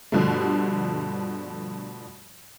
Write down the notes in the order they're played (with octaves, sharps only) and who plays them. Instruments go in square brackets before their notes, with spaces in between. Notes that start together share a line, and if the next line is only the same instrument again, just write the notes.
[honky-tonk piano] G2 B2 D3 F3 G3 A3